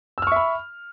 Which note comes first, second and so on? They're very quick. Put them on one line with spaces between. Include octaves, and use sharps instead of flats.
E6 F6 C#6 E5 B5